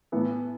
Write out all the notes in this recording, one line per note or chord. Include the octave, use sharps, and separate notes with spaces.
A2 E3 B3